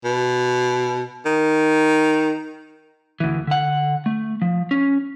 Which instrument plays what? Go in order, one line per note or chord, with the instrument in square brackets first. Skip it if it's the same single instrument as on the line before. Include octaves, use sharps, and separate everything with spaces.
[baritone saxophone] B2
D#3
[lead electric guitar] D2 E3
D3 F#5
A3
F3
C#4